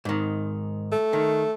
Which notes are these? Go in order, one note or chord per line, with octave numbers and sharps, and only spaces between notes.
G#2 D#3
A3
D#3